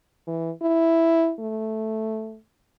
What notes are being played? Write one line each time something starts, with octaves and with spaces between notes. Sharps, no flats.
E3
E4
A3